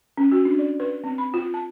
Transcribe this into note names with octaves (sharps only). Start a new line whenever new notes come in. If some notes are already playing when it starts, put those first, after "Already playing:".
C#4
F#4
D4
D5
B4
C4
B5
F4
A5